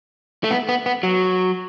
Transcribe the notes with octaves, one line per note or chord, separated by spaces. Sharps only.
A3
B3
B3
B3
F#3